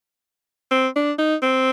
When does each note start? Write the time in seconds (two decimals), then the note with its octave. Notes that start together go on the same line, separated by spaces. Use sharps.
0.71 C4
0.96 D4
1.18 D#4
1.42 C4